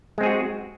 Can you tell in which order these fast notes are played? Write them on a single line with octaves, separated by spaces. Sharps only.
G#3 C4 G#4 F#4